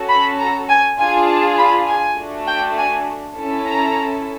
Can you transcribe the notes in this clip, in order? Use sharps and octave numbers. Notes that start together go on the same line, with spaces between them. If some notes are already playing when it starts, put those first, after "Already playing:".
Already playing: C#4 F#4 A4
B5
A#5
G#5
D4 F4 G#4 G#5
A5
B5
G#5
A3 D4 F#4
G5
G#5
C#4 E4 A4
A#5